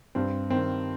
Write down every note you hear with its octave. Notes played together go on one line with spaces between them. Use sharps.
G2 C4
D#3 C4